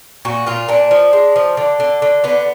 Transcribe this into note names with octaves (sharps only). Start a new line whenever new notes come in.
A#2 F#4
A#2 F4
A#2 D4
F3
G#3
F3
D3
D3
D3
D3 B3